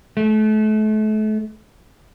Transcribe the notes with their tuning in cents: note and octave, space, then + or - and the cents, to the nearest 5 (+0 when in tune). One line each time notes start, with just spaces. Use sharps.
A3 -35